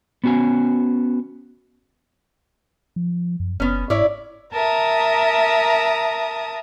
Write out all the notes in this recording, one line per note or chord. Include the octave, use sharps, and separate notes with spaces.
B3 C#4 F#4 B4 G#5
F3
F#2
F#1 B3 C#4
G#2 E4 C#5 D5
A#4 E5 A5 A#5 D#6